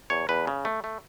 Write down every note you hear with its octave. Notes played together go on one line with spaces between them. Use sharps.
E2 C#5
E2 B4
C#3
A3
A3